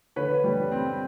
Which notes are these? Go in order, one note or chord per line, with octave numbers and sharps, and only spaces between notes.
D3 B4 C#5
G3
C4